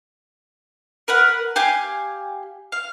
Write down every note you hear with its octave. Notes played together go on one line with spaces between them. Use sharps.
A#4 B4 F#5
G4 F5 G#5 G6
F5